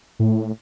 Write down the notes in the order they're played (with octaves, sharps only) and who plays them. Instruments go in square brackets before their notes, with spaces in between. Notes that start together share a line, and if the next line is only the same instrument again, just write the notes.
[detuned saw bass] A2